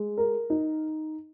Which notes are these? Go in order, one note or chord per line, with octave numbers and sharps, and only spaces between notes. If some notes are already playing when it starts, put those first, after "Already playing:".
Already playing: G#3
A#4
D#4